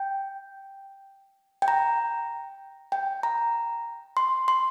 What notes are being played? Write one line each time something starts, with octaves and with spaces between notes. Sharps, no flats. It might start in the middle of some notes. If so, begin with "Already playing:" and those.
Already playing: G5
G5
A#5
G5
A#5
C6
C6